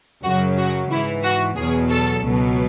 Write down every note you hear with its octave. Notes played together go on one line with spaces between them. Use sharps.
F#2 C#3 F#3 F#4
F#4
G#2 E3 E4
F#4
E2 B2 F#3 G#4
A4
C#2 B2 F#3